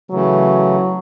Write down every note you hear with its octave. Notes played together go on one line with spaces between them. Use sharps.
C#3 E3 F#3 A3